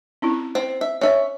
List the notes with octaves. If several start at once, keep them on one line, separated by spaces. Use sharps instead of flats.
C4 C#4 E4
C4 C5
E5
C#4 C#5 E5